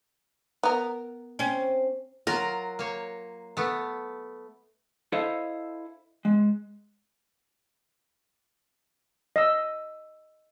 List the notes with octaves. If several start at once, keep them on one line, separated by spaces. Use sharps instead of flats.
B3 A#4
C4 C#4
F#3 F4 A#4
A#3 C#5
A3 B3
E4 A4 C5 D#5 F5
G#3
D#5 E6